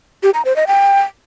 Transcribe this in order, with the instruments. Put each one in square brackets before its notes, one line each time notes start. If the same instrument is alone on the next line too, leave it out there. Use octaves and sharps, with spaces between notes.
[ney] G4
A#5
C5
D#5
G5